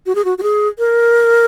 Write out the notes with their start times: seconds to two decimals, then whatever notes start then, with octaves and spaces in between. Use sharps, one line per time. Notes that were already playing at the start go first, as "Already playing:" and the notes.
0.06 F#4
0.15 G#4
0.25 F#4
0.38 F#4
0.43 G#4
0.79 A#4